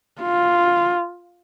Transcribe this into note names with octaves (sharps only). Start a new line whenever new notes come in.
F4